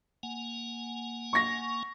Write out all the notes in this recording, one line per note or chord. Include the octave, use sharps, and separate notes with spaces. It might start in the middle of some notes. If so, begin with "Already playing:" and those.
A#3 F#5 G#5
C#6 A#6